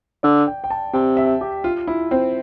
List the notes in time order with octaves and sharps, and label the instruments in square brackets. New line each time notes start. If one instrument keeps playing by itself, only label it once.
[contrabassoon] D3 [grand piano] D5
[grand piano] G5
G5
A5
[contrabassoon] C3 [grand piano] G5
[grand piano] E5
G4
F4
E4
C4